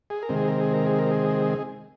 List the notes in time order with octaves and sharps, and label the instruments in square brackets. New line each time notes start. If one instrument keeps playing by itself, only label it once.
[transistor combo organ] G#4
A#4
C3 D#3 G#3 C4
G#4
A#4
G#4
A#4
G#4
A#4
G#4